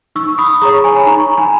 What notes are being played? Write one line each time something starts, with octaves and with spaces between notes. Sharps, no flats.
D#4 C#6 E6
B5 D#6
G#4 C#5 A#5 C#6
G#5 B5
B5
D#4 A#5 C#6
G#5 B5